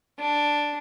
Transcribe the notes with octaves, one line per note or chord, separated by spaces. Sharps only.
D4